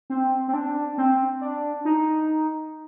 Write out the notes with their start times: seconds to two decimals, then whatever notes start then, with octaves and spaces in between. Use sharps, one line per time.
0.10 C4
0.48 C4
0.53 D4
0.98 C4
1.41 D4
1.85 D#4